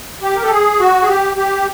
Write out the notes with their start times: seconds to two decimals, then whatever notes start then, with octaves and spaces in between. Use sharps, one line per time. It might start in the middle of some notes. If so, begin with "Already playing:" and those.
0.22 G4
0.36 A#4
0.44 A4
0.51 G#4
0.80 F#4
1.02 G#4
1.08 G4
1.37 G4